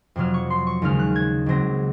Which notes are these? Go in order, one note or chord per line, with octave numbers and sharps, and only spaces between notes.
F2 C3 F#3 F6
C#6
C6
C#6
D#2 C#3 G#3 C#4 F6
F#6
G#6
C#2 C#3 F#3 C4 A#6